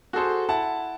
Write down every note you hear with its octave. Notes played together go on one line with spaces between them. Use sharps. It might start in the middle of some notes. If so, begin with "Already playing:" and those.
F#4 G#4 A4 C5
E4 F#5 A5